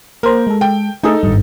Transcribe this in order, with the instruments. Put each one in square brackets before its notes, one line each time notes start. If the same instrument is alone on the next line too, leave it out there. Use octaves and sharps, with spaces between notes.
[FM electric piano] A#3 C5 [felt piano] A#4
[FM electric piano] G#3 A4
[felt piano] G5
[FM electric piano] A3 G#4 [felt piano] D#4 A4
[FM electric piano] G#1 G2